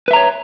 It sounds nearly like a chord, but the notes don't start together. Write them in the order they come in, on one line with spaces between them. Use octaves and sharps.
B4 E5 A#5 C#5